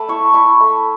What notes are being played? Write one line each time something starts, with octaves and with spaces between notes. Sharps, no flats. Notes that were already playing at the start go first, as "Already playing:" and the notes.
Already playing: A3 A5 B5
E4 C#6
E4 C#6
A3